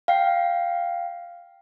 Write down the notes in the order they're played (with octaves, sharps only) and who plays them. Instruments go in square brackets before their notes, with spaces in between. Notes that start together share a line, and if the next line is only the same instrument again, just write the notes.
[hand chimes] F5 G5 C7